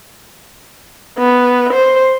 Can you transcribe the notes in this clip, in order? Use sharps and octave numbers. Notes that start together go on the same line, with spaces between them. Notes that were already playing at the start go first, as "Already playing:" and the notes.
B3
C5